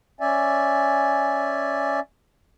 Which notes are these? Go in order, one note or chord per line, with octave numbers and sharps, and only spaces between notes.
C#4 D5 E5 G#5